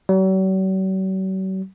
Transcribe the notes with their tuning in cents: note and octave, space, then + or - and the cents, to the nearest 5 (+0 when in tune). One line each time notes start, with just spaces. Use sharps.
F#3 +45